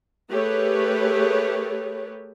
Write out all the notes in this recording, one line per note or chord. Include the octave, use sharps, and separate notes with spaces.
A3 G4 G#4 A#4 B4 C#5